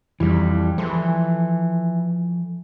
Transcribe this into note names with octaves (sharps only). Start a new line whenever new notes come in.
F2 E3 G3
E3 F3 A4 C6